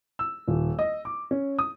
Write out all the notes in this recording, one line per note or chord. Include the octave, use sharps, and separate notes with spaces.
E6
D#1
D#5
D6
C#4
D#6